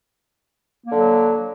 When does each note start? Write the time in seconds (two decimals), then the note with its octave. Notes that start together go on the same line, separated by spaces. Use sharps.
0.86 A#3
0.91 D3
0.96 F#3